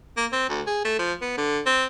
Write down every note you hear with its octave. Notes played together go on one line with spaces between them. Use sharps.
A#3
C4
D2
G#4
A3
F3
B3
D3
C4